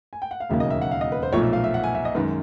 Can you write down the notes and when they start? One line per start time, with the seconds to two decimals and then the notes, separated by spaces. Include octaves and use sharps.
0.13 G#5
0.22 G5
0.31 F#5
0.40 F5
0.49 E1 D#2 C#3 F#3 A#3 E5
0.60 D#5
0.70 E5
0.82 F#5
0.91 F5
1.01 D#5
1.12 B4
1.23 C5
1.33 B1 A#2 F3 A3 C#5
1.43 E5
1.53 F5
1.64 E5
1.74 F#5
1.84 G#5
1.95 E5
2.05 D#5
2.15 F#2 D#3 G#3 B4